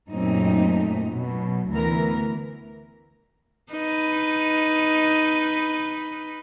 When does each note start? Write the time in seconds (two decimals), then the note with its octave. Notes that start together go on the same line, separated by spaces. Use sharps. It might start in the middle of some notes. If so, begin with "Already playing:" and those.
0.10 F#2 A#2 A3 A#3 C4 D#4
1.06 B2 F#3
1.69 D2 E3 B3 A#4
3.72 D#4 B4